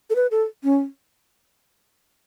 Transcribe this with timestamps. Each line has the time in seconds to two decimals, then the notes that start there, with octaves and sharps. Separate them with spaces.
0.10 A4
0.16 B4
0.31 A4
0.64 C#4